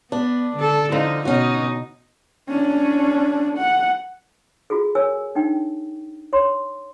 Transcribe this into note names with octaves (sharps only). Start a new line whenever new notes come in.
B3 D4
D3 A4
D3 F3 D#4
B2 C#4 D#4 F#4
C#4 D4
F#5
F4 F#4 G#4 A4
A#4 C#5 G#5 E6
D4 D#4 G5
C#5 C6